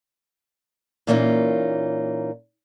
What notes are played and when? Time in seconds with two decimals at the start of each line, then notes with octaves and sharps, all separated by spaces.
1.07 A#2 E3 A#3 C#4 D#4 F4